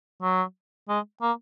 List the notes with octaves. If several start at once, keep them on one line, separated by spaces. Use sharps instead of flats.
F#3
G#3
A#3